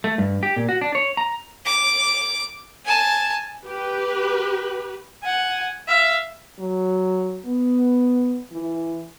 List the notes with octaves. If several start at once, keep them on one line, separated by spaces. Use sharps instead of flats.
A3
G2
G4
A#2
F#4
D4
C#5
A#5
D6
G#5 A5
G4 B4
F#5 G#5
E5 F5
F#3
B3
E3